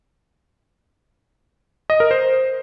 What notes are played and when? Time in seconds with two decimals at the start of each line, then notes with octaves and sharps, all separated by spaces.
1.90 D#5
2.00 A#4
2.11 C5